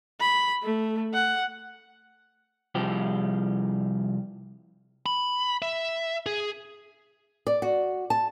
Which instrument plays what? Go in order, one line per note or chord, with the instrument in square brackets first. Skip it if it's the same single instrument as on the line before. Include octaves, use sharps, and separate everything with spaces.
[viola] B5
A3
F#5
[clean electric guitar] C2 F3 G4
[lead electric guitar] B5
E5
G#4
[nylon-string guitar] D5
F#4
A5